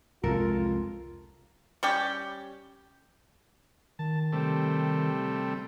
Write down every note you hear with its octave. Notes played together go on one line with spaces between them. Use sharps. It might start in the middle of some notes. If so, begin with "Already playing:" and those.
C2 F2 G#3 F4 A4 A#4
G3 C#4 G4
D#3 A5
C3 G3 A3